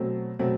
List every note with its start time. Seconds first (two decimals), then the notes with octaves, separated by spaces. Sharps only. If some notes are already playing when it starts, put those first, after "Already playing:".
Already playing: B2 F#3 A3 C4
0.39 B2 F#3 A3 C4